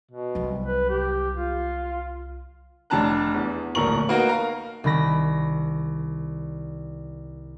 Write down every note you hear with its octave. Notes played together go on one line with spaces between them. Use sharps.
B2
C2 F#3
B4
G4
F4
F1 D4 A5 A#5 F#6
E2
D1 A#1 A#4 A#5 C#6 F#7
A#3 B3 D#4 F#4 A#4
A#4 F5 A#5
C2 D#3 B5 A#6